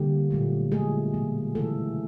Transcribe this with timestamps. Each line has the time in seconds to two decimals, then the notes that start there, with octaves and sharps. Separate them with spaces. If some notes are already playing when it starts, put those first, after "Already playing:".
Already playing: D3 G3 A#3 G4
0.31 A#2 F#3 A3
0.72 D3 F#3 G#3 A3 G#4
1.14 B2 F#3 A#3
1.55 C#3 E3 A3 A4